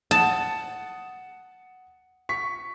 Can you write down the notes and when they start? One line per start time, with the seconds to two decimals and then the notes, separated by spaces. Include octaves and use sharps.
0.11 F#5 A5 D#6
2.29 C#6 B6